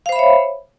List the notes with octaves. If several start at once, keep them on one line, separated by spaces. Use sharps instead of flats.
C5 C#5 E5 F5 B5